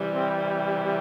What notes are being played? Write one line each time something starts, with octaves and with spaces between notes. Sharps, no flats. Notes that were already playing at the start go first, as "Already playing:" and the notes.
Already playing: C3 E3 G3
C4